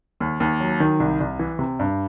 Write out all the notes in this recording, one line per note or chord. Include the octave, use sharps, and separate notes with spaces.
D#2
D#2
F#3
D#3
C2
C2
E3
C3
G2